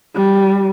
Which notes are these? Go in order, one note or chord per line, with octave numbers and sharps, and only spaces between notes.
G3